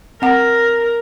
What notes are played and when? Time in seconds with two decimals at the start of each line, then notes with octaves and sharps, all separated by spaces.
0.22 C4 A#4 F#5